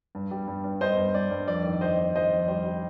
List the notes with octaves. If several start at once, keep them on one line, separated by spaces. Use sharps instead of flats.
G2
G3
G2
G2
G2 C5 D#5
G2
G2 D5
G2
F2 D5
D#3
F2 C5 D#5
D#3
F2 C5 D#5
F2
G3 C5
G3